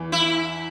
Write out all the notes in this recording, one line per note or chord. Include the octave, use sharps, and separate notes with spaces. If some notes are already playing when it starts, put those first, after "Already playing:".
Already playing: E2 E3
E4